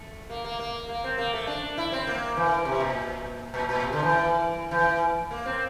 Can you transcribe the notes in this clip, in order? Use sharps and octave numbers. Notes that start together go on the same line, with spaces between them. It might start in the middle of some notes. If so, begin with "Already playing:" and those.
Already playing: A3
A#3
A#3
A#3
A#3
C4
A#3
A3
D4
E4
C4
A#3
E3
C3
A#2
A#2
A#2
C3
D3
E3
E3
A#3
C4